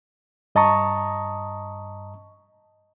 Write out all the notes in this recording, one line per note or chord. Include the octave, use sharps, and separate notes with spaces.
G2 D#5 A5 A#5 C#6 D#6